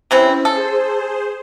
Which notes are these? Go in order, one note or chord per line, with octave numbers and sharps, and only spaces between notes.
C3 E3 C4 C#4 E4
G#4 A4 C5